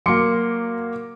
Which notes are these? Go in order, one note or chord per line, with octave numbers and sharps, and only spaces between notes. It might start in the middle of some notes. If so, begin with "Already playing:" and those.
F#3 A#3 C6 D6 C#7